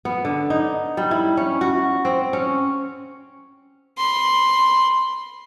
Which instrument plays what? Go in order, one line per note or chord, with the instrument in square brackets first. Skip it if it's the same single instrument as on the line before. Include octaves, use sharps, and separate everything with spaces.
[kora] B3
D3
D#4
G3
E4
C#4
F#4
C4
C#4
[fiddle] B5 C6